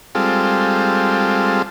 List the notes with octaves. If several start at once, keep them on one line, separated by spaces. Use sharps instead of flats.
G3 G#3 C4 F4 A4